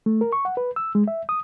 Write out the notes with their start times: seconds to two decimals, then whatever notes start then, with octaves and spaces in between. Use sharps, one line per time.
0.06 A3
0.21 A#4
0.33 C#6
0.45 F#5
0.57 B4
0.76 E6
0.95 G#3
1.08 E5
1.29 D#6